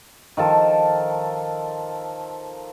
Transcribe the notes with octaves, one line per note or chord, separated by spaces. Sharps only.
D#3 F3 A4 A5